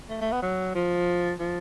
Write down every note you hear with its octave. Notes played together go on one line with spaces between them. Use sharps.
A3
A3
B3
F#3
F3
F3